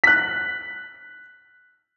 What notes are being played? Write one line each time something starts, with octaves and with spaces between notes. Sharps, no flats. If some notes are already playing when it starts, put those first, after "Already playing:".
F#6 B6